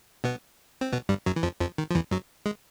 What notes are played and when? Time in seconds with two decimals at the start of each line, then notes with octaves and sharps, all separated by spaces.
0.24 B2 B3
0.81 C4
0.92 B2 B3
1.09 G2 G3
1.26 F#2 F#3
1.36 E3
1.43 F2 F3
1.61 F2 F3
1.78 D#3
1.91 F3
1.95 E2 E3
2.11 F#2 F#3
2.46 G#3